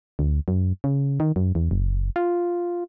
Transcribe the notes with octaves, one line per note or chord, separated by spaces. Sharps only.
D2
F#2
C#3
D#3
F#2
E2
F#1
F4